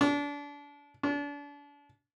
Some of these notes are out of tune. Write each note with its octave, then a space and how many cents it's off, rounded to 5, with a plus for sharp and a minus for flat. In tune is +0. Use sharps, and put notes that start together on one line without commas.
D4 -30
D4 -35